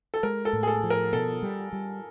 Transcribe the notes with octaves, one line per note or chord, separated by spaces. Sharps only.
A4
G#3 A#4
A4
A2
G#4
A4
F3
A#4
B2 A4
G3
G3